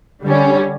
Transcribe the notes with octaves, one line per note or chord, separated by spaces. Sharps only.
D3 G3 C#4